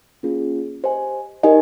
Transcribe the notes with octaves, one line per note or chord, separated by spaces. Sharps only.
A#3 C#4 F4 G#4
G4 C5 D#5 G#5
D#4 G4 A#4 D#5 G#5